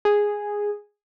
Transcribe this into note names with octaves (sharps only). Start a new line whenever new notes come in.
G#4